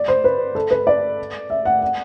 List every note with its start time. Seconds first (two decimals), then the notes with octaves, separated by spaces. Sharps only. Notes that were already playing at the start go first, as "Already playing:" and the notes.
Already playing: D5
0.08 C5
0.24 B4
0.55 A4
0.71 B4
0.87 D5
1.50 E5
1.65 F#5
1.82 F#5